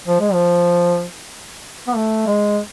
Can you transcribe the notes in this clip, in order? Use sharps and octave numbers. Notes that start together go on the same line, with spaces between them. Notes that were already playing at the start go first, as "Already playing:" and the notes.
F3
G#3
F3
B3
A3
G#3